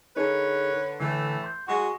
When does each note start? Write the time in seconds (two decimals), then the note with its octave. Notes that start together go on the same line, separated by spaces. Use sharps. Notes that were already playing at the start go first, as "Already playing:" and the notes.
0.16 D3 D#4 G#4 A#4 B4 C#5
1.01 A2 D3 E3 A3
1.44 C6 G6
1.68 G#3 F#4 C#6